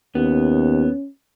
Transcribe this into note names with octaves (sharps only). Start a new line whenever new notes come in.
D#2 B3 C#4